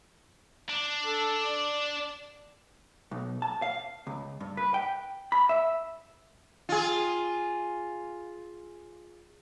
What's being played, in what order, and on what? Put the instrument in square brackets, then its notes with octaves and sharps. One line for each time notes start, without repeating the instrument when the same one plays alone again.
[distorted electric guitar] D4
[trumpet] A4
D5
[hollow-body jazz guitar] B1
A5
F5
C#2
G2
B4
G5
B5
E5
[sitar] F4 G#4